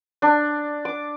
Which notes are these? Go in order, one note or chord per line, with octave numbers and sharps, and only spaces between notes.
D4
D6